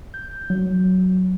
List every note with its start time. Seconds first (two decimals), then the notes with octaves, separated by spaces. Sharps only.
0.14 G6
0.50 F#3